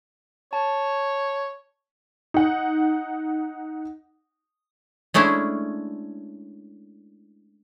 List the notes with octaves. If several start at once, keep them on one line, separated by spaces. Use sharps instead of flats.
C#5 A5
D#4 F#5
G#3 A3 C#4 D4 E4